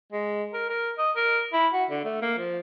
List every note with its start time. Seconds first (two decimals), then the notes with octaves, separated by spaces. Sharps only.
0.12 G#3
0.53 A#4
0.69 A#4
0.98 D#5
1.16 A#4
1.53 E4
1.73 F#4
1.90 D3
2.04 A3
2.22 A#3
2.38 F3